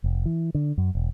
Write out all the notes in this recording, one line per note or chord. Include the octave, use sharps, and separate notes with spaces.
F1
E3
D3
F#2
E1